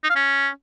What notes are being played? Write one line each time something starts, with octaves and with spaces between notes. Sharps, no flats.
D#4
F5
C#4